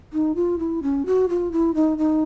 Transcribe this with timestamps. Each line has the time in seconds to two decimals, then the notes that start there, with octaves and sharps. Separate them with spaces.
0.13 D#4
0.35 F4
0.59 E4
0.83 C#4
1.06 F#4
1.29 F4
1.52 E4
1.75 D#4
1.98 D#4